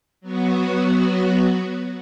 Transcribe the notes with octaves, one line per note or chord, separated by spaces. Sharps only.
F#3 B3 F#4